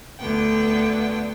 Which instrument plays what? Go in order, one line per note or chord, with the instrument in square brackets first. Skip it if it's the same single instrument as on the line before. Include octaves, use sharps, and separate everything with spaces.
[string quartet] D2 D3 B3 G5